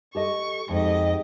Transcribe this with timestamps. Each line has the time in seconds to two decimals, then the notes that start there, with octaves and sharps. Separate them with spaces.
0.15 G4 A4 D#5 C#6
0.69 F2 G#2 G4 D#5